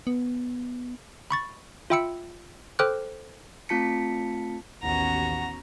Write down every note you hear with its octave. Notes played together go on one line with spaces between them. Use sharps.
B3
B5 C#6 A6
F4 E5 G5 B5 E6 C#7
A4 C5 G5 D6 F6 F#6
A3 C4 F4 A5 B6 C#7
A1 D#2 B3 C#4 F#4 F#5 A#5